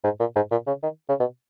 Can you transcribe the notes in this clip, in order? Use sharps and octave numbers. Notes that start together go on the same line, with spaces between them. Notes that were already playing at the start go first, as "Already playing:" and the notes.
G#2
A#2
G#2
A#2
C#3
D#3
C#3
B2